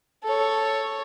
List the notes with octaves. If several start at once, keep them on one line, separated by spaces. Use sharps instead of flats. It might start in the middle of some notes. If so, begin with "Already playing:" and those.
A4 C#5